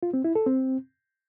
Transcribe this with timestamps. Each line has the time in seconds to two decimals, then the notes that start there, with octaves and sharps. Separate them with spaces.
0.03 F4
0.14 C4
0.24 E4
0.35 A4
0.46 C4